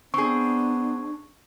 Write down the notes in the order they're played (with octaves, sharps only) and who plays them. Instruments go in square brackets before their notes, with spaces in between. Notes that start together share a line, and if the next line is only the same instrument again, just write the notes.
[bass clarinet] B3 [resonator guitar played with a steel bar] C4 G#4 [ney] D4 [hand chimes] C#6